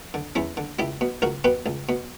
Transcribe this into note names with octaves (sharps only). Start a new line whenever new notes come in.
D3
E2 C#4 E4
D3
C#2 E4 G4
B2
C#2 F#4 A#4
B2 G4 B4
C#2
B2